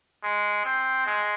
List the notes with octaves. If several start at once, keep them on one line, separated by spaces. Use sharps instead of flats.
G#3
C4
G#3